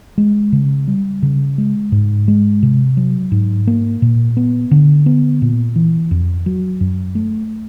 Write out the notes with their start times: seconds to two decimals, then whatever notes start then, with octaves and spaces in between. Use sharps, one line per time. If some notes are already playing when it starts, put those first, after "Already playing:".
0.18 G#3
0.52 C#3
0.88 G3
1.22 C#3
1.58 G#3
1.92 G#2
2.28 G#3
2.63 C3
2.97 F#3
3.32 G#2
3.67 A#3
4.02 A#2
4.37 B3
4.71 D3
5.06 B3
5.42 A#2
5.76 E3
6.11 F2
6.46 F#3
6.81 F#2
7.15 A3